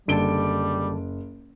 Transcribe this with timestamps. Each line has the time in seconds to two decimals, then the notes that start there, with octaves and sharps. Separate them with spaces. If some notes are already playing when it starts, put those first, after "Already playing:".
0.08 F#1 D3 G3 A4 A5 D7 G7